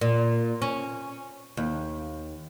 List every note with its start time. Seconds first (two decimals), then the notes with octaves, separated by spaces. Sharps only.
0.01 A#2
0.62 C#4
1.57 D#2